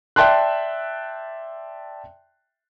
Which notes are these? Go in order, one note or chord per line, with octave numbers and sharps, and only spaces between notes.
D5 E5 G5 A5 C6 F#6